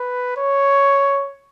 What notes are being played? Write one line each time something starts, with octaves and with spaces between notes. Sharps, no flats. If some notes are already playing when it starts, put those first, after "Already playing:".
Already playing: B4
C#5